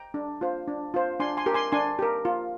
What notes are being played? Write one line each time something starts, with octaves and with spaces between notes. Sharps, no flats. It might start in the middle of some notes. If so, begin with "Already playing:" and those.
Already playing: G5 A#5
D4
F4 C5
D4
F4 C5
D4 G#5 C6
G#5 C6
G4 A#4
G#5 C6
D4 G#5 C6
G4 A#4
F4